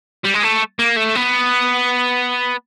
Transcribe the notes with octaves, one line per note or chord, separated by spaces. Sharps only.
G3
G#3
A3
A#3
A3
B3